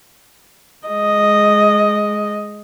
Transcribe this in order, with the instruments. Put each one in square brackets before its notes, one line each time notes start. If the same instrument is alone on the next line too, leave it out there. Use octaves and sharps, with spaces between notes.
[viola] G#3 D#5